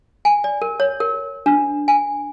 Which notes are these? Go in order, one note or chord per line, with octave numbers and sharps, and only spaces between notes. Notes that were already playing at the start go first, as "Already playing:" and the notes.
G#5
D5
A#4
C#5
A#4
D4
G#5